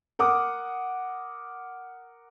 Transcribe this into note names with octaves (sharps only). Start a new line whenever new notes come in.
A#4 F#5 D6 D#6